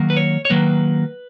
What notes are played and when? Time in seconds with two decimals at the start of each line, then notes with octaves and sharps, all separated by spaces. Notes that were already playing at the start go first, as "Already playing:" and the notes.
Already playing: D#3 F#3 A#3
0.10 B4
0.17 C#5
0.45 C#5
0.50 D#3 F#3 A#3 B4